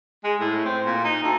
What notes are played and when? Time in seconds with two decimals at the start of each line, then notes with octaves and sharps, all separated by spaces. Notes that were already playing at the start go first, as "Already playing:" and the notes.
0.24 G#3
0.40 A2
0.65 C4
0.85 A#2
1.05 D#4
1.23 D2